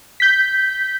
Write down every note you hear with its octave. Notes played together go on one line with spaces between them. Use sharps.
G6 B6